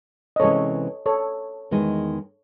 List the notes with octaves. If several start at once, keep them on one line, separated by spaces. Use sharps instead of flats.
D#5
C3 E3 G#3 C#4 A4 C#5
A4 C#5
E2 D#3 G#3